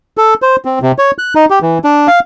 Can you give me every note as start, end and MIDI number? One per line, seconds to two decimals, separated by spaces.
0.17 0.34 69
0.42 0.56 72
0.65 0.79 60
0.82 0.92 48
0.98 1.11 73
1.18 1.34 90
1.35 1.45 63
1.50 1.59 67
1.62 1.78 52
1.84 2.07 62
2.08 2.20 77